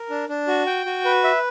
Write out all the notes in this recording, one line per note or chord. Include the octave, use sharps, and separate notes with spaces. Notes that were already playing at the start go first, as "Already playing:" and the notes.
Already playing: A#4
D4
D4
F#4
G5
F#4
B4
E5